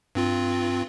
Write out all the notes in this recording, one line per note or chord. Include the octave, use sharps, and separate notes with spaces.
G2 C4 F4